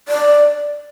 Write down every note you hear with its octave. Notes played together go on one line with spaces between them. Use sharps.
D5